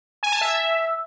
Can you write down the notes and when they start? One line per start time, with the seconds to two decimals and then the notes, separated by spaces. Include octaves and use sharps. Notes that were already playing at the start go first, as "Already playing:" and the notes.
0.23 G#5
0.32 A5
0.41 E5